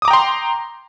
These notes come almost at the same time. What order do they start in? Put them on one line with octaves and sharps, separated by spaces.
D#6 D6 A#5 G5 C6